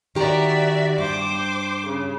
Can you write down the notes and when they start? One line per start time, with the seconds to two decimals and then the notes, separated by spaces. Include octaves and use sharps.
0.15 D#3 F#4 G4 D5 E5 A#5
0.98 G2 C5 D6
1.87 C#3